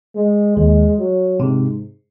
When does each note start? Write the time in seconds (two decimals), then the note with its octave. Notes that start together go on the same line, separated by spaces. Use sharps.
0.15 G#3
0.57 D#2 D#3 G#3
0.99 F#3
1.40 G#2 C3